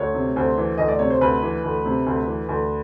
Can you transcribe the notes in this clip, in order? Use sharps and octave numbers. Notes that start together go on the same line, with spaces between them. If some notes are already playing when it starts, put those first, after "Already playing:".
Already playing: D2 C#5
C3
D2 C5
E3
D2 D#5
D5
C3 C#5
C5
D2 B4
E3
D2
C3
D2
E3
D2